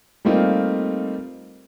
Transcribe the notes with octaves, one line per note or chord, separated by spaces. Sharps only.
G3 A3 A#3 C4 D#4 F4